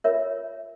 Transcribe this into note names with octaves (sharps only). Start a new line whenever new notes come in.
F4 A#4 C#5 E5